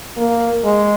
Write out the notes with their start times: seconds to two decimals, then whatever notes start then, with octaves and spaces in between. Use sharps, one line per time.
0.18 A#3
0.65 G#3